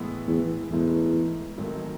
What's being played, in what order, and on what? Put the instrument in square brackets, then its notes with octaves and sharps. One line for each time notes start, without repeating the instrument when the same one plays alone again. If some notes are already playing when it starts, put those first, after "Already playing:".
Already playing: [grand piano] A2 E3 G#3 B3 E4
[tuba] E2
[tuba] E2 [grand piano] G#2 E3 A3
[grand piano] G#1 G#2 D#3 F#3 A3